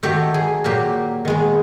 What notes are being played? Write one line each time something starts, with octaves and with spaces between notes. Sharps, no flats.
D#3 F#3 A3 G4
G#4
A#2 F#3 A#3 G4
D#3 G#3 B3